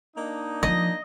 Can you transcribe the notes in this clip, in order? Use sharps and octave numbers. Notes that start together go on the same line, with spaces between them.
A#3 D4 D#4
E3 F3 D#5